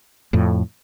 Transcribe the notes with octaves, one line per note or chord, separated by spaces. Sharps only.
F2 A2